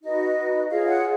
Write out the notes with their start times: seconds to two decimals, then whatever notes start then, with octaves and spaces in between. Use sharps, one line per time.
0.02 D#4 F#4 B4 D#5
0.69 F4 G#4 C#5 F5
0.86 F#5